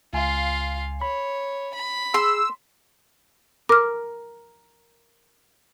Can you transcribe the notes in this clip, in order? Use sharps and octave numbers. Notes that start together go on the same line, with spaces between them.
C#2 F4 F5 G#5
C#5 B5
B5
G#4 C6 E6
A#4 D6 F6